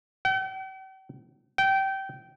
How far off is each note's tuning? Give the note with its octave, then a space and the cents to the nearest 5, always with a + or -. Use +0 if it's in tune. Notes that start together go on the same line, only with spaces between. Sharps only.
G5 -45
G5 -20